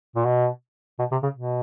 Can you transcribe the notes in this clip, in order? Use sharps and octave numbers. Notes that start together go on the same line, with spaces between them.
A#2
B2
B2
C3
C#3
B2